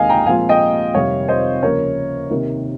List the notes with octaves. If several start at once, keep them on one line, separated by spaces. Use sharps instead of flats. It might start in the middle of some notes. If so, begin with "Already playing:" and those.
Already playing: D#2 D#3 G#3 C4 D#5 F5 G#5
G5 A#5
A#2 F3 G#3 C4 F4 F5 G#5
D#5 G5
F2 C3 D#3 G3 C#5 F5
C5 D#5
D#2 C#3 F3 A#4 C#5
C3 D#3 A#3